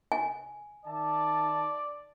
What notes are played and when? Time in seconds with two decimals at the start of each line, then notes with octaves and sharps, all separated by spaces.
0.12 G#5
0.86 D#3 D5 E5 A5